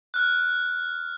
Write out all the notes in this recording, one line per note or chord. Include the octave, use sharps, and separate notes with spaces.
F6 F#6